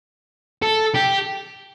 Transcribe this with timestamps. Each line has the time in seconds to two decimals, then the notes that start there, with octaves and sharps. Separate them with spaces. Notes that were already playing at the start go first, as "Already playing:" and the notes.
0.63 A4
0.95 G4